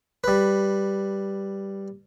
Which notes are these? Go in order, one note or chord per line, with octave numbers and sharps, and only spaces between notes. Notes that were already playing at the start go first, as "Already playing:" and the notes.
G3 B4